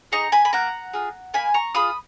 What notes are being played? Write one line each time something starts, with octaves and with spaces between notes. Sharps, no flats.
D#4 G#4 A#5 C#6
G#5 B5
B5
A#3 F#5 A#5
F4 G#4
A#3 G#5 B5
A#5 C#6
F4 G#4 B5 D#6